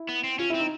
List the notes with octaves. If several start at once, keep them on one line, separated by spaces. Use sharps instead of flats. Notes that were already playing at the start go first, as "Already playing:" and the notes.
Already playing: E4
B3
C4
C#4 F4
E4
C4
D#4